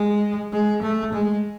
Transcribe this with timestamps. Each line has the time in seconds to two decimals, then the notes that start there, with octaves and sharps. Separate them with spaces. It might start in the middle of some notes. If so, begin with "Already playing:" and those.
Already playing: G#3
0.53 G#3
0.82 A3
1.13 G#3